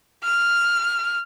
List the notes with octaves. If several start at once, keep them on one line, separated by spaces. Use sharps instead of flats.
F6